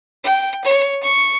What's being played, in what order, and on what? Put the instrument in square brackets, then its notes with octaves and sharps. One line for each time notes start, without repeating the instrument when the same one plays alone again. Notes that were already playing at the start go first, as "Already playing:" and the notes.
[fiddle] G5
C#5
C#6